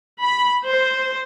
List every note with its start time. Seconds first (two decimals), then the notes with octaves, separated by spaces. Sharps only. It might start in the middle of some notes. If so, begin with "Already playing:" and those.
0.21 B5
0.64 C5